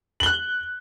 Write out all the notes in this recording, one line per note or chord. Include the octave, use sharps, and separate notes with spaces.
F#6 F#7 G7